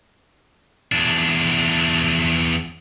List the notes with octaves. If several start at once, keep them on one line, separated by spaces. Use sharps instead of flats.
E2 D4